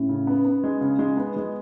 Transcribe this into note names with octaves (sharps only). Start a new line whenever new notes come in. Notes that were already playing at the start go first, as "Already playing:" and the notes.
Already playing: A2 C#4
C#3
B3
B3
G#3
C#3 D4
G#3 F4
B3 D4
G#3 F4